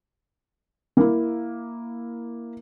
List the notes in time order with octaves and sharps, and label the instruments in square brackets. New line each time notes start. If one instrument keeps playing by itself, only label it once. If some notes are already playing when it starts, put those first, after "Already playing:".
[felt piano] A#3 E4